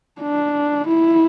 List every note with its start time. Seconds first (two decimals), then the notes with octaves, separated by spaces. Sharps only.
0.21 D4
0.88 E4